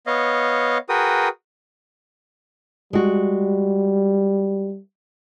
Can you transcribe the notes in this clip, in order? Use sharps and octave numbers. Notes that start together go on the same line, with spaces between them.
B3 C#5 D#5 F5
F#4 G#4 A#4 B4 G5 D#6
G3 G#3 F#4